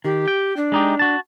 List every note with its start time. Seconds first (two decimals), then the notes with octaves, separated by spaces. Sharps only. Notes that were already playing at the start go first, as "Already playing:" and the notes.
0.05 D#3 G4
0.28 G5
0.57 D4
0.72 G#3 D#4 G4
0.99 F#4 A5